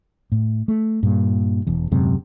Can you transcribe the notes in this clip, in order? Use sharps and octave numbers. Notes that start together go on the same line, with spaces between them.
A2
A3
G2 A#2
E1 E2
D#1 F#2 C3 G#3